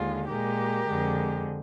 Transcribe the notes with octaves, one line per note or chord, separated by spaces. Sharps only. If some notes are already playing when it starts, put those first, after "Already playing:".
Already playing: D#2 D3 G#3 F4
A#2 G#3 G4 A#4
F2 D3 G#3